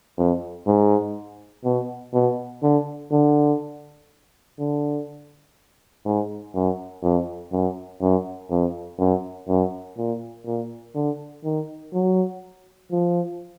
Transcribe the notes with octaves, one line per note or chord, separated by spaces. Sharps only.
F2
G#2
B2
B2
D3
D3
D3
G#2
F#2
F2
F#2
F#2
F2
F#2
F#2
A#2
A#2
D3
D#3
F#3
F3